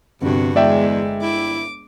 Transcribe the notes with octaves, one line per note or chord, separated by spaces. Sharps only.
G1 G2 C3 F#4
E2 G#3 D5 E5 G5
E4 D6